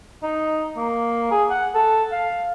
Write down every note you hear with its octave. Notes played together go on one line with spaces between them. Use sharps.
D#4
A#3
G#4
F#5
A4
F5